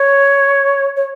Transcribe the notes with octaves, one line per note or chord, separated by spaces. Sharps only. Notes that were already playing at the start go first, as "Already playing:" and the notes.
Already playing: C#5
C#5